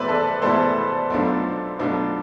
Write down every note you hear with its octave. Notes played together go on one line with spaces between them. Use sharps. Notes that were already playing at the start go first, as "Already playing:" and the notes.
Already playing: E2 B2 A3 E4 B4 C5 D5 E5
A4
E2 B2 A3 E4 A4 C5
B1 B2 A3 D4 F4
B1 B2 A3 D4 F4